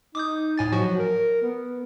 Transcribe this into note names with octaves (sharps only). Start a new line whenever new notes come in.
D#4 D6 D#6 G6
A2 G#5 A6
F3 F#3 F#4
A#4
B3